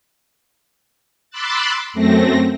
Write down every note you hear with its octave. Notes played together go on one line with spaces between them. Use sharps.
B5 C6 D6 E6 F#6 A6
F#2 A3 C4 A#6